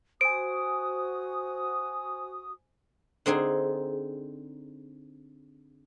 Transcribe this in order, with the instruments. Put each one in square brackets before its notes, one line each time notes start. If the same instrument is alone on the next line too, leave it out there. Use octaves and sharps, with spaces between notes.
[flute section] F#4 D#6 [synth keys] C5 G#5 [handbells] D7
[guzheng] D3 C4 D#4 G#4